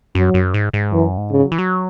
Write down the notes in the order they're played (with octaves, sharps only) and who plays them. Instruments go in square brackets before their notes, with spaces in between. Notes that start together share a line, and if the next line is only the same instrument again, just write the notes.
[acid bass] F#2 [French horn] F#3
[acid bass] F#2
G#2
G#2
[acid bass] F#2 [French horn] E3
[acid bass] G#2
[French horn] C#3
[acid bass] F#3
E3
F#3